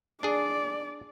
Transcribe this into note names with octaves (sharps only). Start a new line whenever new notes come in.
D4 G#4 D5